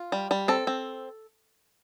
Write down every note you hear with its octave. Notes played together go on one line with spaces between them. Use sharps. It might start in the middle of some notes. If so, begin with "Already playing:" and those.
Already playing: F4
G3
G3
C4 A4
C4